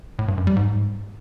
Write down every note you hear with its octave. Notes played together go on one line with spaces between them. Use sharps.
A2
G2
F#2
G3
G#2